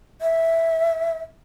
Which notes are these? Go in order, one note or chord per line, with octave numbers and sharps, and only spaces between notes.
E5